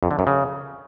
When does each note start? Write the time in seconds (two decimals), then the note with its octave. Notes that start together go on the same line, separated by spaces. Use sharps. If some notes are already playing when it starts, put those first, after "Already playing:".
0.03 F2
0.11 D3
0.19 F#2
0.27 C#3